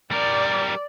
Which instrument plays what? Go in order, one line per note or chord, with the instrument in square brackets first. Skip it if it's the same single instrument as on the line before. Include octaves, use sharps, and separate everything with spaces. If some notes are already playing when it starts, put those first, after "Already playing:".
[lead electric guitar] G3 A#4 [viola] D5